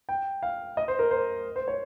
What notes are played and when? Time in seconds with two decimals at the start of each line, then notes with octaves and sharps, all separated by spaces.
0.09 G5
0.43 F5
0.77 D#5
0.88 C5
0.99 A#4
1.11 C5
1.56 C5
1.68 C#5